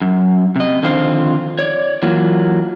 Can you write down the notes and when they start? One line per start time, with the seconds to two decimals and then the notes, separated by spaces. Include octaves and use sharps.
0.02 F#2
0.56 C3 D#5
0.83 D3 D#3 F3 C4 F4 C5
1.59 C#5 D5
2.02 E3 F#3 A#3 F4